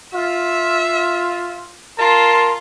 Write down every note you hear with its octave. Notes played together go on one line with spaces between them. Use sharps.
F4 E5
F4 A#4 A5 C6